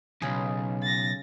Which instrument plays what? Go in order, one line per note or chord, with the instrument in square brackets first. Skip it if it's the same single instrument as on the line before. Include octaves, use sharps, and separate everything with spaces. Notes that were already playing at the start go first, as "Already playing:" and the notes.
[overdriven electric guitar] B1 E2 [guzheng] C#3 G#4
[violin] A6 A#6